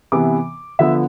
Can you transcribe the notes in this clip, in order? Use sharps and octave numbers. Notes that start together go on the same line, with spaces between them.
C3 E3 B3 D6
D3 F3 B3 E5